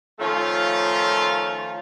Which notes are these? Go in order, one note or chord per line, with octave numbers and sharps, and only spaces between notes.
D#3 F3 A3 C#4 F4